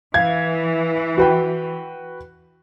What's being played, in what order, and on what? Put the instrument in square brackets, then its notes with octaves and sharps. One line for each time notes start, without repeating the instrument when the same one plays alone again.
[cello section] E3 [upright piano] F5 G#6
[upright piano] F#4 B4 G5